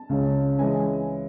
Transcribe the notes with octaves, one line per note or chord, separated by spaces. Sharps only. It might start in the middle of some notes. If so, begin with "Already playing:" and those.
Already playing: A5
C#2 C#3 G#3 C#4
E3 G#3 C#4 G#5